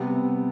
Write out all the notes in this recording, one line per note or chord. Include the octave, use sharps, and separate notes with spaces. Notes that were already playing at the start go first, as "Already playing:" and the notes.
Already playing: C3 G3 B3